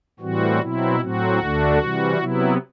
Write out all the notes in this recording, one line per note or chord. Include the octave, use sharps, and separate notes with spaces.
A2 E3 G3 C4 F#4
B2 F#3 C4 E4
A2 F#3 C4 F#4
D2 D3 A3 D4
C3 E3 G3
C3 F#3 B3 E4